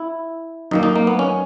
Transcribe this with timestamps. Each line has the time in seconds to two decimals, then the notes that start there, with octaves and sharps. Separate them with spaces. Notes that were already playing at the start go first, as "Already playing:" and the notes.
Already playing: E4
0.71 F#2 D#3 A#3 D#4
0.83 D#4
0.96 A#3
1.07 B3
1.19 C#4